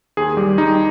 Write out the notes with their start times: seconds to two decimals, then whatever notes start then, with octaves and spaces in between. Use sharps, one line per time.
0.17 D#2 G#4
0.37 G3 G4
0.58 G3 D#4